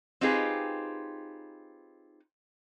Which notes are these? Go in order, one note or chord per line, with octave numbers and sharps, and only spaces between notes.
C4 D#4 F4 G4 G#4 B4